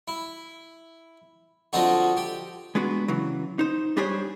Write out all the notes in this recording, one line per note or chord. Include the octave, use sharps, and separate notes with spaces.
E4
D3 F3 C4 D#4 F#4
G4
G#3 B3 D4 F#4
C#3 E3 F#3
D#4 C5
G3 D4 G4 G#4 C5 C#5